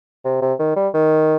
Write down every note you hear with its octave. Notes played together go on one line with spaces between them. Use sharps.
C3
C3
D#3
G3
D#3